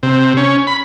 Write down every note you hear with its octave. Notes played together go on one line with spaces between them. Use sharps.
C3
C#4
B5